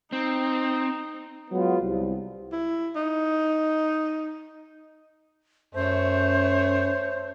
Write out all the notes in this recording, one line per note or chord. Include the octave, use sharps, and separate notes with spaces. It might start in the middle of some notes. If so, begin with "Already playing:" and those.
C4 D#4
F#3 G#3 B3 F4
C2
E4
D#4
F#2 A3 C5 C#5